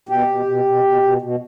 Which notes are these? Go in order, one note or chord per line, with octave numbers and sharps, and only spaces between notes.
B2 G4
B2
B2
B2
B2
B2
B2